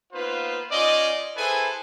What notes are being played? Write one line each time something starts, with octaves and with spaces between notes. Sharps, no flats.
A#3 B3 D#4 F4 B4 C5
C#4 D#4 F4 D5 D#5
E4 G#4 A4 B4 C5 G#5